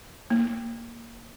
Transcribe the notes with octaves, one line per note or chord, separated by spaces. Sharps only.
A#3